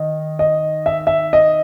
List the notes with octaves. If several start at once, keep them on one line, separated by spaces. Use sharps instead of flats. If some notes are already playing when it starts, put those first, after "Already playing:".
Already playing: D#3 D#5
D#5
E5
E5
D#5